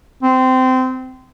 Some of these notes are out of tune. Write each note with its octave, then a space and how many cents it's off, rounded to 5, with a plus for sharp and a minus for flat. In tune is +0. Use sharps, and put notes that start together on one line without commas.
C4 -20